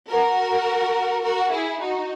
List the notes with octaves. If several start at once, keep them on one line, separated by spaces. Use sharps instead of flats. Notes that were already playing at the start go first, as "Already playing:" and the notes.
F#4 A#4
F#4 A#4
E4 G#4
D#4 F#4